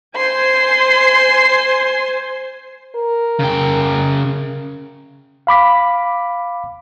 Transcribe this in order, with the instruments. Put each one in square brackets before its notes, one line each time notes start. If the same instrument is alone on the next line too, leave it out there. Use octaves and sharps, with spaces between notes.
[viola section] C5 G#5 [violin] C6
[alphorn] A#4
[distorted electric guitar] C#3 G5
[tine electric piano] F5 B5 D6 B6